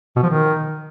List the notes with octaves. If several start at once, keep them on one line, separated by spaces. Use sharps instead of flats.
B2
F3
D#3